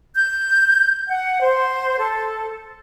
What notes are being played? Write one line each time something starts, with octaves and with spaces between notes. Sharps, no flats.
G6
F#5
C5
A4